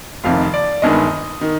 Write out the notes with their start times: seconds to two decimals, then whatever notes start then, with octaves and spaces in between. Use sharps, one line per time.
0.24 F1 F2 C3 D#3 F5
0.54 D5
0.82 G1 G2 D#3 G#3 D#5
1.41 D#3